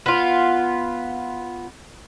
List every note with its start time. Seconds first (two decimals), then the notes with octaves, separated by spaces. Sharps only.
0.06 B3 F4